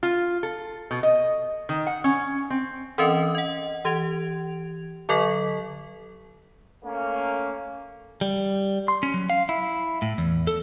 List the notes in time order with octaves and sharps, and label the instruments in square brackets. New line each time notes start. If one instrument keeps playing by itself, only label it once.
[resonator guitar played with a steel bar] F4
A4
B2
D#5
D#3
F#5
C#4
C4
[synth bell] E3 C4 C#4 A#4 D#5
D#5 F#5
E3 G4 G#6 D7 F7
D3 F#3 A4 D#5 C#6 B6
[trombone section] A3 A#3 C#4
[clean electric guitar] G3
C6
C#4
F#3
F5
E4
A2
E2
A4